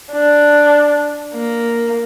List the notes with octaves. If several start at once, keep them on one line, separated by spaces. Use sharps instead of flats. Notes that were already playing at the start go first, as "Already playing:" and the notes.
D4
A#3